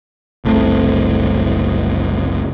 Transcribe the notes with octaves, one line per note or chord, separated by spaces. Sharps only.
F#1 C2 A3 C4